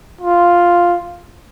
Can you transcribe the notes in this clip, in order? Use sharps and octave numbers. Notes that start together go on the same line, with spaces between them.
F4